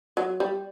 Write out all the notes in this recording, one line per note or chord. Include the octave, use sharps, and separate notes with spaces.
F#3
G3